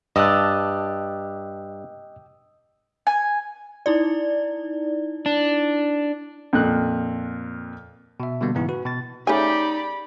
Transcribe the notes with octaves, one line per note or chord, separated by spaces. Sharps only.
G2 G4 D5 D#5 A5 D#6 E6 F#6
G#5
D#4 E4 D5
D4
F2 A#2 F#6
B2 E5
B2 D3 G3 A#3 B3
G#2 C#3 E3 B3 E4
F#4 B4
B2 A6
C#3 A3 D#4 G4 D5 G#5 B5